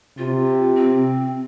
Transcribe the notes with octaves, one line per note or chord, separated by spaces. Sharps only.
C3 F4
C4